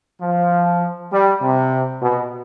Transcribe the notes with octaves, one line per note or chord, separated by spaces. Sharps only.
F3
G3
C3
B2